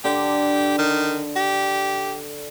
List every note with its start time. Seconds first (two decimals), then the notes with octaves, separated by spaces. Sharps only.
0.04 D3 G4
0.78 D#3
1.36 G4